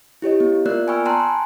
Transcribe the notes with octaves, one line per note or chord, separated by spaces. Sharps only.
E4 G4 C#5 D#5
B3
A#3 B3 F4 A#4 D5 F#6
G5 G#5 B5 C#6 E6 F6
G5 A5 A#5 C6 F#6
G#5